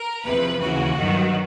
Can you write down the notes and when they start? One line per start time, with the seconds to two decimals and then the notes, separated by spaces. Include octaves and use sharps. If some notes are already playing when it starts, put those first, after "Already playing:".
Already playing: A#4
0.24 E2 C3 F3 B4
0.60 D#2 C#3 E3 F#4
0.97 G2 D#3 F#3